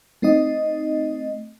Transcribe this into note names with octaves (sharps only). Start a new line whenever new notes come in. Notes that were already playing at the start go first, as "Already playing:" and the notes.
A3 C4 D#4 D#5